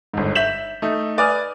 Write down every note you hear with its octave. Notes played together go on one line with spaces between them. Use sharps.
G1 G#2
E5 G6 B6 E7 F#7
A3 D#4
B4 D5 G#5 D6 D#6 F6